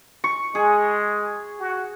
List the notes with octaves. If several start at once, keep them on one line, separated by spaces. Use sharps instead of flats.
C#6
G#3 G#4
F#4